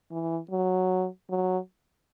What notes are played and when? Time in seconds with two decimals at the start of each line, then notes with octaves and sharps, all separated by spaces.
0.11 E3
0.51 F#3
1.30 F#3